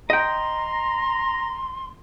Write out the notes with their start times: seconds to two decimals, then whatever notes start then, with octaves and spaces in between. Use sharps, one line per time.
0.10 D#5 G5 A#5 C6